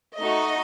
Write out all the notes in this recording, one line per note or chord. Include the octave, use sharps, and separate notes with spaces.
A3 D#4 F#4 D#5